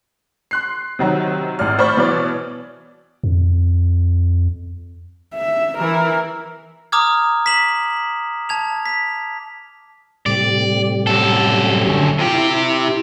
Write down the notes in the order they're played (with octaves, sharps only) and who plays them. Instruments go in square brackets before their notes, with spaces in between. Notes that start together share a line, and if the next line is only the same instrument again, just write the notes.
[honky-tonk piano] C6 F#6 C7
C3 D#3 F#3
G#1 A2 D5 F6
C5 D5 B5 C#6
B2 E3 C#5 D5
[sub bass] F2
[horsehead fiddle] E5
[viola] E3 E4 [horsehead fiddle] A#4
[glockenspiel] A#5 D6 D#6 F6 G#6
B6 E7 F#7
A5 G#6 F7
B6
[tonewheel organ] A2 C3 G3 [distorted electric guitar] D5
[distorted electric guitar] F#2 A4
[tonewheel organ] D3 G#5 C#6
[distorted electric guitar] C3 G4 [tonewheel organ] F4
[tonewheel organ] E4